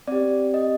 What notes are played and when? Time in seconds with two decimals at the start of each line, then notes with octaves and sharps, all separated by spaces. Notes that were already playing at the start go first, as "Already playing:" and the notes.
0.07 C4 G4 D5
0.54 D#5